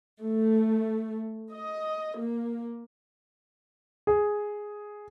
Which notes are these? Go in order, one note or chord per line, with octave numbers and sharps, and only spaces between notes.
A3
D#5
A#3
G#4